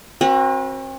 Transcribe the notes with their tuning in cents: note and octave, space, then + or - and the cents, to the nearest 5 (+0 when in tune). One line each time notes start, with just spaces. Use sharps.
C4 +40 F#4 +0 B4 -30